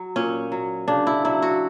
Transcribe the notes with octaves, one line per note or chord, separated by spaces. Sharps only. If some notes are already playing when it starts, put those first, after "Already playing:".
Already playing: F#3
A#2 C#4
F#3
C#3 D4
E4
F#3 E4
F#4